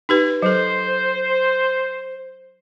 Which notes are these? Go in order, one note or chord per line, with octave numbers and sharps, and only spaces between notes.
D#4 G4 B4
F#3 A4 C5